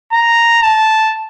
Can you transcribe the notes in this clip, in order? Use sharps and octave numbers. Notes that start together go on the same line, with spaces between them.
A#5
A5